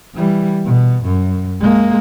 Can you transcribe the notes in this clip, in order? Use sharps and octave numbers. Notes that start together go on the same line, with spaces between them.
E3 G3
B2
F#2
G#3 A#3